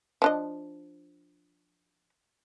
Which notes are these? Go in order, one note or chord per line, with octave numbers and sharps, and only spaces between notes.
F3 D4 D#5